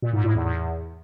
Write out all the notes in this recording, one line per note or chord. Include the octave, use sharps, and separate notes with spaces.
A#2
G#2
A2
E2
E2